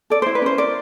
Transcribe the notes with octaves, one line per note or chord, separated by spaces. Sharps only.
A4 D5
E4 C5
B4
C#4 C5
A#4 D5